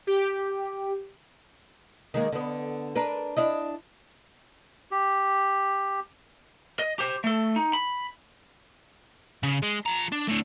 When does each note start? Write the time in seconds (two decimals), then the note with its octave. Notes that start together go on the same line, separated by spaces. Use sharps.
0.07 G4
2.14 D#3 G#3 A#3
2.32 D3 B3
2.95 D4 A#4 B4
3.37 D4 E4 D#5
4.91 G4
6.79 D#5
6.99 G4 C5
7.24 A3 A4
7.56 D#4
7.73 B5
9.43 C#3
9.62 G#3
9.86 F3 A#5
10.12 D4
10.28 A2 D3